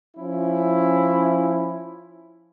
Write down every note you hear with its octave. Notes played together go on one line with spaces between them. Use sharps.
F3 C#4 E4